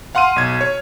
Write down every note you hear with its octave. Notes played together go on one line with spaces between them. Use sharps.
F5 F#5 C6 F6 D#7
B1 G#6
C#5